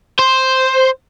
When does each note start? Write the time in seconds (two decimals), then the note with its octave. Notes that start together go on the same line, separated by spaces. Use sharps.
0.19 C5